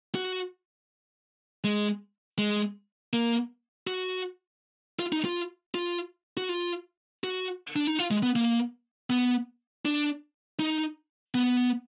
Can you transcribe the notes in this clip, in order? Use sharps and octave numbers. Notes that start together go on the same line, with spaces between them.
F#4
G#3
G#3
A#3
F#4
F4
D#4
F4
F4
F#4
F4
F#4
D4
D#4
F4
G#3
B3
A#3
B3
D4
D#4
B3